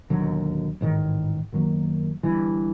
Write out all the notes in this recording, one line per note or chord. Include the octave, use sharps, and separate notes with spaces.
E1 D#2 D3 F#3
A1 G#2 D#3
F#2 D#3 F#3 A#3
G1 G2 E3